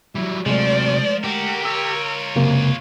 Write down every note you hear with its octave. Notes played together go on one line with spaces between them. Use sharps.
F#3 G3 E4
C3 F3 F#3 G#3 A3 D5
D3 F#4 G4 A#4
F4 C#5 E6
C#2 F#2 C3 A#3